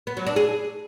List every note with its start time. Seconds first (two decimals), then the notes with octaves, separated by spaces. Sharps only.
0.07 B3
0.17 F#3
0.26 D4
0.36 G#4